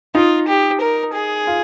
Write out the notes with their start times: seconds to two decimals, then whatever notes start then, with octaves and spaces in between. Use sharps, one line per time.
0.15 D#4 F4
0.48 G4
0.81 A#4
1.14 G#4
1.47 F4